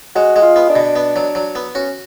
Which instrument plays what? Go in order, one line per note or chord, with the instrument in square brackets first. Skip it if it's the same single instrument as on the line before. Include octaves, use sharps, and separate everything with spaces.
[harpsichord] G#3 [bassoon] F#4
[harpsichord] G#3
[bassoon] F4
[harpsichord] B3
[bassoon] D4
[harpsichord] B2
B3
F#3
F#3
B3
[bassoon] C#4 [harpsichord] F#4